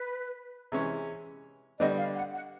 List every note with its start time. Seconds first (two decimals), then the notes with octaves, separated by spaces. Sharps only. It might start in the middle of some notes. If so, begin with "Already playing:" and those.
Already playing: B4
0.72 C3 E3 G#3 C#4
1.79 D3 G3 B3 D4 D#5
1.98 F5
2.16 F#5
2.34 F#5